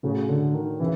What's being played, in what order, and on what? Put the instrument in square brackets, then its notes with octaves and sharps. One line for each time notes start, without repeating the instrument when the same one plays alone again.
[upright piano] A2 F#3 A3 [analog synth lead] C#3
[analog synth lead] D3
D#3
[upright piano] C#3 [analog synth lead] E3